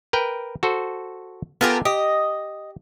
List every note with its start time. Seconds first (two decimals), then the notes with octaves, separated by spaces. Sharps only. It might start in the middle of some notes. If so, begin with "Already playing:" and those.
0.13 A#4 B4 G5
0.63 F#4 A4 C5
1.61 B3 F4 G4 A4 A#4 G#5
1.85 G4 D#5